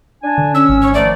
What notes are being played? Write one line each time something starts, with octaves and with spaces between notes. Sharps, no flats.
D4 G#5
D3
C#4 E6
G#1
C#5
D#3 F3 A3 D5